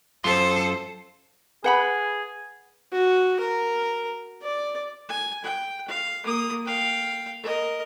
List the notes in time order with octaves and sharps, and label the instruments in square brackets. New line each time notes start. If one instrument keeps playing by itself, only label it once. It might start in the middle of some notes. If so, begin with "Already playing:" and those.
[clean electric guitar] F#2 F4 C6 [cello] A4 C5
[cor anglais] G#4 [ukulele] B4 F#5 B5
[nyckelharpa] F#4
A#4
D5
G#5
G5
F5
A#3 D#6
F5 G5
A#4 D#5